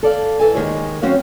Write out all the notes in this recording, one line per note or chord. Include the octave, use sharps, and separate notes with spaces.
A4 D5 F5
E3 A4 G#5
D#2 D#3 G#3 G#4 C#5
F#3 C4 C#4 F#4 F5